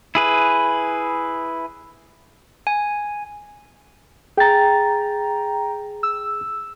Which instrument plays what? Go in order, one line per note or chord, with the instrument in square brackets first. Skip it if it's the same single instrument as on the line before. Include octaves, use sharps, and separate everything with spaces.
[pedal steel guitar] E4 G#4 B4
[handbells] G#5
[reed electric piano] G#4 A6 [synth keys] G5 A#5
[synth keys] E6